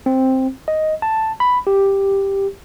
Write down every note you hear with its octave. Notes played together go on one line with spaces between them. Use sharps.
C4
D#5
A5
B5
G4